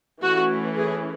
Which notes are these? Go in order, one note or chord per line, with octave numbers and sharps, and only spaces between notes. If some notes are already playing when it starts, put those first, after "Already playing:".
E3 A3 C#4 F#4
G#4